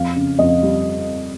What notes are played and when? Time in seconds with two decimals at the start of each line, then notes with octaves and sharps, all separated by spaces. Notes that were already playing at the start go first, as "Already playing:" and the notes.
Already playing: F2 F5
0.16 C#3
0.39 F2 D#5
0.63 G3